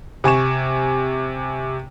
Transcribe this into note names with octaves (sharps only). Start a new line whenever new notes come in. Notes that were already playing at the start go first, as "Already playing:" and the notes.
C3 G#5 C#6 E7